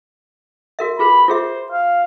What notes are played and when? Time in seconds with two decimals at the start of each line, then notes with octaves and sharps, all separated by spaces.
0.79 F#4 A#4 E5
0.99 F4 G#4 B4 B5
1.28 F4 G#4 C5 E5
1.72 F5